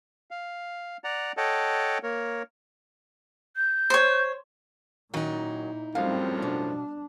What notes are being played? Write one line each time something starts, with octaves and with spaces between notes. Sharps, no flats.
F5
D5 F#5 A#5
A4 C#5 D#5 F#5 G5 A5
A#3 A#4 C#5
G6
C5 C#5
A#2 D#3 F#3 C#4 D#4 E4
F#2 A2 F3 G3 C4 F5
B2 D4